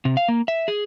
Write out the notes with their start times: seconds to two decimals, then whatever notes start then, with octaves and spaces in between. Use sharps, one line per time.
0.05 C3
0.17 F5
0.29 A#3
0.48 E5
0.68 G#4